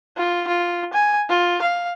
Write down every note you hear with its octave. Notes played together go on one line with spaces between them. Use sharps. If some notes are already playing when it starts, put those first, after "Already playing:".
F4
F4
G#5
F4
F5